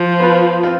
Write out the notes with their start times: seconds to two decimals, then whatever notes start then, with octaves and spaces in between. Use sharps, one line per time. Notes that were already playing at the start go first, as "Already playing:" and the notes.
Already playing: F3
0.20 B3 F4 B4
0.63 C4 F4